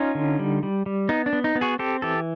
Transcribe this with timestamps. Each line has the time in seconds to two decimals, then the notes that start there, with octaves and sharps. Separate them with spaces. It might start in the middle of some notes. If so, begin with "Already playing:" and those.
Already playing: C#4 D#4 F4
0.15 D3
0.39 G3
0.63 G3
0.86 G3
1.09 B3 D#4
1.26 D4
1.33 B3
1.44 D#4
1.55 B3
1.61 F#4 G#4
1.79 C4 G4 A4
2.02 E3 G4 A4